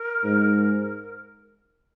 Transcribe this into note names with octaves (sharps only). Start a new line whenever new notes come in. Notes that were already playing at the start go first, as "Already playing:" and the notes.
Already playing: A#4
G#2